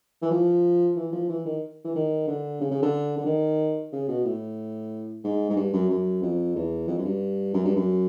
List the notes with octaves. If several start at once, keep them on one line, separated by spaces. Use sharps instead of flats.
E3
F3
E3
F3
E3
D#3
E3
D#3
D3
C#3
C#3
D3
D3
D#3
C#3
B2
A2
G#2
G#2
G2
F#2
F#2
F2
E2
F2
F#2
G2
F#2
G2
F#2